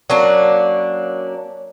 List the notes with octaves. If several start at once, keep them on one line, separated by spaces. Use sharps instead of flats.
F#3 A#3 C#4 D4